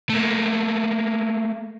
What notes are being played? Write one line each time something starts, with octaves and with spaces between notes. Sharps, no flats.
A3 A#3